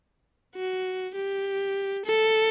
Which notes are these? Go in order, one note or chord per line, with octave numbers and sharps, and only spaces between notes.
F#4
G4
A4